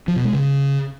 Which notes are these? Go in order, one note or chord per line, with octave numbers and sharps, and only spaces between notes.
F3
B2
G#3
C#3